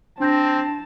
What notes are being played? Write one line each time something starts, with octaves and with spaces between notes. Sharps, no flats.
C4 D4 A5 G6 A#6